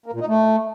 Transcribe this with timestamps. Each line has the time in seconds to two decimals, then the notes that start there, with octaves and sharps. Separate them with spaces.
0.06 A#3
0.13 A#2
0.21 D#4
0.28 A3